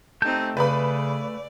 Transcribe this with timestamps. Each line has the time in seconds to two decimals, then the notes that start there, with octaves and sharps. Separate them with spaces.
0.22 A3 C4 D#4 G4 A5 G6
0.57 C#3 B4 D5 B5